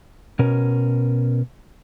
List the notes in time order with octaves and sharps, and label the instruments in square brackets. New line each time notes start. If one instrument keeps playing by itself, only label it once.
[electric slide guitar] B2 C#4 A#4